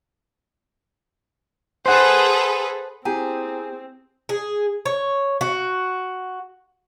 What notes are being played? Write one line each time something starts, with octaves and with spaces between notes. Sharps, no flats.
G#4 A4 B4 C5 F#5
C4 E4 G4 G#4 A#5
G#4
C#5
F#4